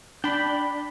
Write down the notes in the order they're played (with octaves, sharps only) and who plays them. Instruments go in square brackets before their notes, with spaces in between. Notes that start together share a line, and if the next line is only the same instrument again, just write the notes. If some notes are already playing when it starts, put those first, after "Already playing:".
[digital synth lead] D4 [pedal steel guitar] G5 B5